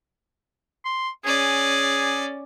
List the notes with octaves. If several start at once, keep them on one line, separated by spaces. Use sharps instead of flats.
C6
C#4 G#4 D5